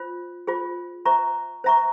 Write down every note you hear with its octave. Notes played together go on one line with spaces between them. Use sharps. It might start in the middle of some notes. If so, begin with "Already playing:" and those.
Already playing: F4 C5
F4 G#4 C5
C5 E5 A#5 C#6
C5 E5 A#5 C#6